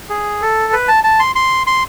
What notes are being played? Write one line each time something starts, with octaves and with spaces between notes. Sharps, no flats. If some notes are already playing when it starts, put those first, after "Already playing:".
G#4
A4
B4
A5
A5
C6
C6
C6